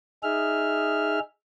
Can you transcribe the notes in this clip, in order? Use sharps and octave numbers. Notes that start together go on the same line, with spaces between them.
D#4 G#4 E5 F6